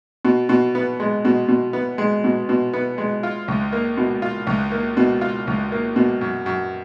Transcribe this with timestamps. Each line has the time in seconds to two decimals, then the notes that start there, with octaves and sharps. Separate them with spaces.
0.25 B2
0.49 B2
0.75 B3
1.00 G#3
1.25 B2
1.48 B2
1.73 B3
1.98 G#3
2.24 B2
2.49 B2
2.73 B3
2.98 G#3
3.23 F4
3.48 C#2
3.72 A#3
3.97 B2
4.22 F4
4.47 C#2
4.72 A#3
4.97 B2
5.21 F4
5.47 C#2
5.72 A#3
5.96 B2
6.21 F#2
6.46 F#2